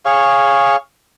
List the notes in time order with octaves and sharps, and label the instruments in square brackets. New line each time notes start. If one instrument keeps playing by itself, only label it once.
[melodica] G#4 C#5 F5 C#6